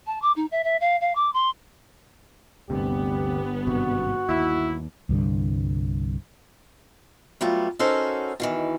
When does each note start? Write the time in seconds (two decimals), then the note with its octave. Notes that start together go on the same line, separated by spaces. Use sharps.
0.06 A5
0.22 D6
0.36 D#4
0.51 E5
0.64 E5
0.80 F5
1.01 F5
1.15 D6
1.33 C6
2.70 G1 D2 C3 B3 G4
3.67 G#1 G2 C3 F#4
4.29 D#2 E4
5.09 C2 G2 D3
7.41 F#3 G3 A3 B3 F4
7.79 C#4 D#4 F#4 A4 A#4 C5
8.40 B2 D#3 E3